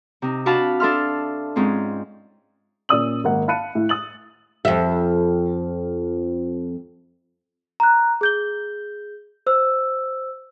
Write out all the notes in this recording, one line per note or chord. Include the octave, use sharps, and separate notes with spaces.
C3 D#4
D4 F#4 F5 A5 B5
D4 A4 E5 C6 F6
G#2 C4 C#4 F4
A#2 C#4 D5 D#6 E6 F#7
G#1 A#3 F#5
F5 A5 B5 F#6 C#7 D#7
A2
D#6 A6 F#7
F2 E5
A#5 F#6
G#4 G6 G7
C5 E6